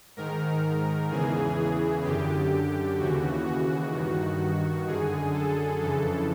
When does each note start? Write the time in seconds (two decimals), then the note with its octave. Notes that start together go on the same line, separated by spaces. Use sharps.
0.17 G#2 D#3 A#4
1.11 E2 C#3 E3 G#4
2.04 F#2 D3 G4
2.99 D#2 C#3 E3 F#4
3.46 F#4
3.93 G2 D#3
4.87 F#2 D3 G#4
5.34 A4
5.81 F2 C#3 E3 A4